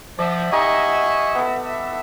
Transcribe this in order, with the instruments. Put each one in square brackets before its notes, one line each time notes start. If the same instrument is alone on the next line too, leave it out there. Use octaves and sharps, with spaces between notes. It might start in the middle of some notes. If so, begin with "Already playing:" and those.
[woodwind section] F3 [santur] D5 [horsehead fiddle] E5 F#5
[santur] D#4 G4 A#5 [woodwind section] D#5 G#5 C#6
[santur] B3 A4
[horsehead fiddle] E5